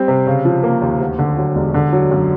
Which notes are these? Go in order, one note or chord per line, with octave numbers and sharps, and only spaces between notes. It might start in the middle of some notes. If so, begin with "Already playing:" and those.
Already playing: G3 C4
C3
C#3
F3
A#3
D#2
D2
D3
F#3
E1
D3
F#3
F#2